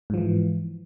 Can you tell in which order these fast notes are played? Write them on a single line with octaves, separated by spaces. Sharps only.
G#2 F3 E3